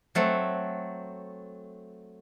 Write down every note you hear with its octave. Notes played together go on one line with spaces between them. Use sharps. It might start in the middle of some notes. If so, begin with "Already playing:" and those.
F#3 A3 C4